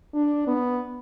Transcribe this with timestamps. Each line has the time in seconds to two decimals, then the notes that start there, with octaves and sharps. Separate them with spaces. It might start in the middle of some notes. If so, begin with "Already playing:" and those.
0.14 D4
0.47 B3